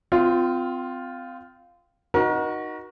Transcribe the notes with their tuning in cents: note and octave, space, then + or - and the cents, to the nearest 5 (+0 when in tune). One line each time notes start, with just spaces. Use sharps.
C4 -25 F4 +0
D#4 +0 F#4 +0 A#4 +35